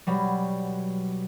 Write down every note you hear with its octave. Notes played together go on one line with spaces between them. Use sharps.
B2 F#3 G3